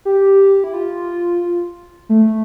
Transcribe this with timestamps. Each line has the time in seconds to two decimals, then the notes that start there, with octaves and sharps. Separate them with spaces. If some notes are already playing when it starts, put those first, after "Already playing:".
0.05 G4
0.64 E4
0.73 F4
2.09 A3